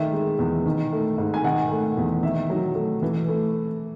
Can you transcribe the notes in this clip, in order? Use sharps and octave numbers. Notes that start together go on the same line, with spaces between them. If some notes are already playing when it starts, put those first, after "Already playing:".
Already playing: D#3 A3 E5
G#3
E2
D#3
A3
G#2
G#5
D#3 F#5
A3
E2
D#3 E5
F#3
A3
E3
A3